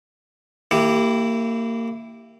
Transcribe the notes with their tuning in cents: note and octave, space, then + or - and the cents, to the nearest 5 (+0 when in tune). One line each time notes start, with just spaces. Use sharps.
A#3 -25 E4 +0 G4 +0